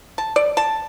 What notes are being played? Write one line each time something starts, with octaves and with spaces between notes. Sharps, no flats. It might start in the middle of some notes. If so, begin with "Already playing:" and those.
A5
D5
A5